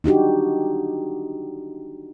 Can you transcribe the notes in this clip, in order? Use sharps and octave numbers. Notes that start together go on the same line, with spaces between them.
D4 D#4 F#4 G4